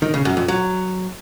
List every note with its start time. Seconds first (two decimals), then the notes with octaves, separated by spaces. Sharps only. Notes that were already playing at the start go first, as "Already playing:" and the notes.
0.02 D#3
0.14 C#3
0.25 F#2
0.37 F2
0.48 F#3